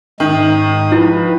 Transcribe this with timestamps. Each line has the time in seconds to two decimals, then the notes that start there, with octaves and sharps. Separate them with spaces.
0.20 G#2 D#3 D#4 D#6
0.92 F3 E4 B4